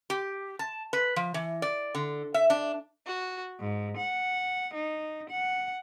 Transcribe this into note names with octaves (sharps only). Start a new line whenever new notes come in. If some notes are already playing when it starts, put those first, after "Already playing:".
G4
A5
B4
F3
E3
D5
D3
E5
D4
F#4
G#2
F#5
D#4
F#5